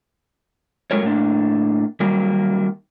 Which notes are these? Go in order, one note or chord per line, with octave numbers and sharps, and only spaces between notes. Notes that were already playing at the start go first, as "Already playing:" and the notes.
F#3 G#3 F4 A4 A#4 C#5
A2 A#3 D4
D#3 F#3 G3 A#3